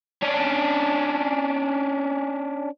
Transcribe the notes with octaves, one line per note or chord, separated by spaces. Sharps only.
C#4 D4